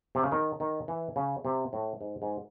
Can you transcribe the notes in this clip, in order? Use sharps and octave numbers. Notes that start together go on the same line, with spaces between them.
C3
C#3
D#3
D#3
E3
C#3
C3
A2
G#2
G#2